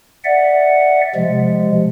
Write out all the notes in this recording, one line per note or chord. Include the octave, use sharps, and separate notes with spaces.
D5 E5 F#5
C3 F3 G#3